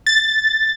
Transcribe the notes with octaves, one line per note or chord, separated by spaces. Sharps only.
A6